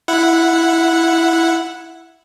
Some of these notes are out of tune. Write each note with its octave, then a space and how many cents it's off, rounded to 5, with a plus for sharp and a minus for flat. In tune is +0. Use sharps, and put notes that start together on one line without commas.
E4 +5 F#5 -10